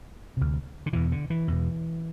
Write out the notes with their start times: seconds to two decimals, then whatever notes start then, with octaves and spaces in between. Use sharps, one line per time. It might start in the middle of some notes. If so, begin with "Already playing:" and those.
0.37 D2 C3
0.86 D3
0.93 E2 B2 E3
1.12 D3
1.30 E3
1.48 E2 B2